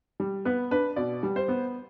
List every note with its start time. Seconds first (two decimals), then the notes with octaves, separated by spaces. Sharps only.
0.20 G3
0.45 B3 B4
0.71 D4 B4
0.96 B2 D5
1.23 G3
1.36 C5
1.48 B3